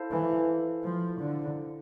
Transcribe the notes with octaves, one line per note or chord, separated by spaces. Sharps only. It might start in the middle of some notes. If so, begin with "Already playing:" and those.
Already playing: E4 A4 C5 F5 A5
E3
F3
D3